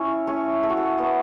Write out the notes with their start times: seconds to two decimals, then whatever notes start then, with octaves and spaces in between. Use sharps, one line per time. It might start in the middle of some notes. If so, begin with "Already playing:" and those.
Already playing: C#4 E4 C#5 E5
0.27 A3 C#4 C#5
0.63 A3 A4
0.70 F#4
0.77 A4
0.98 A3 B3 B4